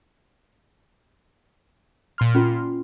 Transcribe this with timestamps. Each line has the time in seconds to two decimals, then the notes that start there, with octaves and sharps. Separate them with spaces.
2.18 A#2 C6 F6
2.35 C#4 F4